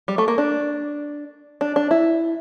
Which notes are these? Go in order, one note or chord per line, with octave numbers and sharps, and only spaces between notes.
G3
A3
A#3
D4
D4
D4
E4